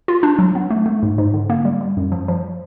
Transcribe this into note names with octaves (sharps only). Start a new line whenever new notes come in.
F4
D4
F#3
B3
A3
A3
G#2
G#2
D3
A#3
G3
G3
F#2
F3
F3